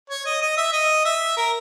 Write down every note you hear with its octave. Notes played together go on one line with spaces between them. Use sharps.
C#5
D#5
D#5
E5
D#5
E5
A#4